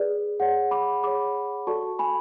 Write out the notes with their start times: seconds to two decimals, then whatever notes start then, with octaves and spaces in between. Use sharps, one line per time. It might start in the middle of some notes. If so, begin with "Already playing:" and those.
Already playing: G#4 B4 D5
0.40 G#4 C#5 F#5
0.71 B5 D6
1.03 G#4 C#5 B5 D6
1.67 F#4 A4 D5 A5 C#6
1.99 G#5 B5